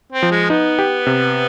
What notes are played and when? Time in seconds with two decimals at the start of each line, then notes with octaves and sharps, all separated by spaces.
0.12 C4
0.23 F3
0.32 G#3
0.50 B3 D#4
0.79 G4
1.07 C3